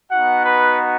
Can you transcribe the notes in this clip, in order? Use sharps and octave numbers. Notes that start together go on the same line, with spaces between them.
B3 D#4 F#4 F#5
B4